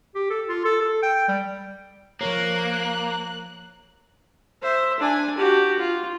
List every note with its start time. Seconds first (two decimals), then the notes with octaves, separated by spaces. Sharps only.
0.15 G4
0.30 A4
0.49 F4
0.65 A4
0.82 A4
1.03 G5
1.28 G3
2.21 F3 A#3 A#4 C#5 F#6
4.62 C5 E5
4.99 D4 G#5
5.37 F#4 G4
5.78 F4